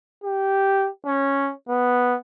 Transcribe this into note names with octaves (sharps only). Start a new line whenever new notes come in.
G4
C#4
B3